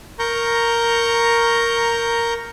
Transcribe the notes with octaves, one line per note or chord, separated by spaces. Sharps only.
A#4 A#5 C#6 G6